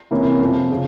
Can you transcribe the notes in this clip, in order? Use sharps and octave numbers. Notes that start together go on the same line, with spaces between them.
C3 E3 A#3 C#4 E4
F2 C3 F3
C#3